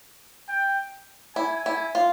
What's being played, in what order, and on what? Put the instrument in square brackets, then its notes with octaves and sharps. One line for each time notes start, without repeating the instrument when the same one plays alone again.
[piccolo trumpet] G5
[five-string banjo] E4 [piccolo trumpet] G#5
[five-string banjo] E4
F4